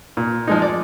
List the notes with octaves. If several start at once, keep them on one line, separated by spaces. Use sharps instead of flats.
A#2
F3 G#3 D#4
D5